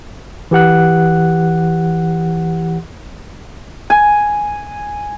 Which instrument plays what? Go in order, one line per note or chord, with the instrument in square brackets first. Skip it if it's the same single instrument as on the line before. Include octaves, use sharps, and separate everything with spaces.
[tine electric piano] E3 G4 F#5 F#6
[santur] G#5